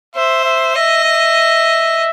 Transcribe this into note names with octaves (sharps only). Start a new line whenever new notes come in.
C5 E5
E5
D#5 E5
E5